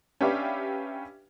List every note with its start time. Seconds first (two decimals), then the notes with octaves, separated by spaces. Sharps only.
0.21 C#4 D4 G4 B4 E5 F5